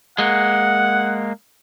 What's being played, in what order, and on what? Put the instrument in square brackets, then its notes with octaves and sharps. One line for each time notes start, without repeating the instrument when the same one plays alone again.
[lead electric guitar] G#3 A#3 [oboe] F#5